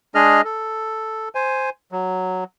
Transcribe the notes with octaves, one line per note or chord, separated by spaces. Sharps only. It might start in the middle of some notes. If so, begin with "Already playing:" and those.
G#3 D4 G#4 D#5 F6
A4
C5 G#5
F#3